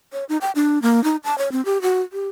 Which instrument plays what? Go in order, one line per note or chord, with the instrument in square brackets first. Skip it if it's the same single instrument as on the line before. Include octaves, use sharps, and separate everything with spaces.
[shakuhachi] C#5
D#4
G5
D4
A#3
D#4
A5
C#5
C4
G4
F#4
G4